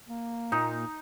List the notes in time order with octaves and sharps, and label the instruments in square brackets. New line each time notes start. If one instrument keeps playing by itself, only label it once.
[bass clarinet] A#3
[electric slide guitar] A#2 [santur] D#4